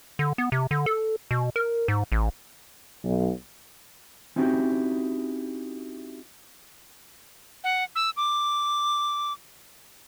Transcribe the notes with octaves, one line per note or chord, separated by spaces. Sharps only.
D3
B3
C3
D3
A4
B2
A#4
G#2
A1
B1
C4 C#4 D#4 E4 F#4 G4
F#5
E6
D6